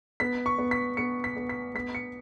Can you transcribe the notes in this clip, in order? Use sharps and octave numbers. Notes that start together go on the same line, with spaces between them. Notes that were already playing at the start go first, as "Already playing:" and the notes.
B3 B6
C#6
B3
B6
B3 C#7
B6
B3
B6
B3 B6
C#7